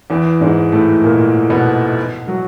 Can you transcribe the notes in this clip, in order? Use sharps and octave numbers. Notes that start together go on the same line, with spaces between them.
E2 E3
G#2 G#3
A2 A3
A#2 A#3
B2 B3
F#3 F#4